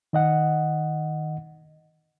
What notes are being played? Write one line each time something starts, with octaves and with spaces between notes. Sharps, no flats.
D#3 D#5 F#5